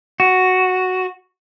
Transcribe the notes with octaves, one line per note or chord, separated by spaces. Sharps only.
F#4